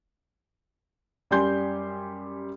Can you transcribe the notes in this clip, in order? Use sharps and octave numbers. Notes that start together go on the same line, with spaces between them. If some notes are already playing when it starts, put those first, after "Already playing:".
F#2 G3 G4 G#5 C6 G6